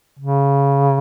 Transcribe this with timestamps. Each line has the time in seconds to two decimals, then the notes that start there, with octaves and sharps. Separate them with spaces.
0.19 C#3